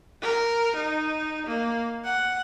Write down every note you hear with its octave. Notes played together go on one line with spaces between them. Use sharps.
A#4
D#4
A#3
F#5